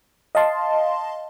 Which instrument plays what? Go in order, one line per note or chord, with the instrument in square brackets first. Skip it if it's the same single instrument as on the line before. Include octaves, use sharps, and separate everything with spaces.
[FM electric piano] D#5 F5 A5 C6